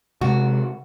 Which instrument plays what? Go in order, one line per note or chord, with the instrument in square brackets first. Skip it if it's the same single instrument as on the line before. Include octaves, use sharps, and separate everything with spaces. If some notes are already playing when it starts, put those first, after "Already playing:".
[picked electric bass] C3 G#3 [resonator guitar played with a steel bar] F#4